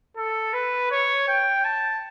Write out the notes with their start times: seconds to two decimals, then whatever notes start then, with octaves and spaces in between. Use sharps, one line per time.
0.17 A4
0.53 B4
0.91 C#5
1.28 G5
1.65 A5